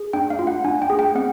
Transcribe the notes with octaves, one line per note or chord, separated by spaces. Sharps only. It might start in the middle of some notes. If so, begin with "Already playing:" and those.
Already playing: G#4
D4 G5
F5
F4
F#5
D4 G#5
G5
G#4
G5
C4 F#5